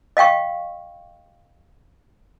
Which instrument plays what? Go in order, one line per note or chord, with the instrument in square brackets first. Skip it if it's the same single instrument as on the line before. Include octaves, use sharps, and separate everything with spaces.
[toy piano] D#5 F5 G5 C#6